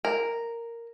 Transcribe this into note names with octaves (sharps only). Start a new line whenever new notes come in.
A#4